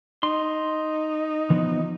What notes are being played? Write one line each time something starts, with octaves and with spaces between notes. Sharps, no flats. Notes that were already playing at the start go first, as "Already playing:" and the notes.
D#4 C6
E3 F3 B3